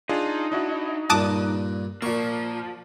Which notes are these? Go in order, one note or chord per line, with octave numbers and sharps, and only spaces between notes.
D4 D#4 F4 G#4
D4 E4 F#4
G2 A#2 A5 D6 D#6 F#6
A#2 F3 A#3 C#6